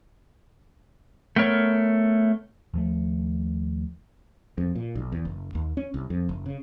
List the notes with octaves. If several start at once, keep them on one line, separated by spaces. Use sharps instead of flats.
A3 B3 A#4 C#5
D#2 F3 A3
F2
A#2
B1
E2
F#1
D#2
C#4
C2
F2
F#1
C#3